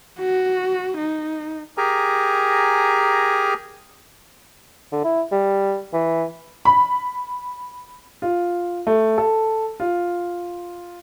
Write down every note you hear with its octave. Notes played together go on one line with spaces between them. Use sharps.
F#4
D#4
G4 G#4 A#4 G#5 A#5
D3
E4
G3
E3
B5
F4
A3
A4
F4